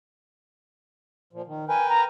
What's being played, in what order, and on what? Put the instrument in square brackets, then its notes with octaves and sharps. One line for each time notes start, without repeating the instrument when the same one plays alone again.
[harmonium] A#2 F3
D#3
[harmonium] A#4 B4 G5 [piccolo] G#5
[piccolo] A#5